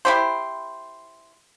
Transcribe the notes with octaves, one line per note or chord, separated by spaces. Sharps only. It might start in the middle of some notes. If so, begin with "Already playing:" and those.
E4 G4 C5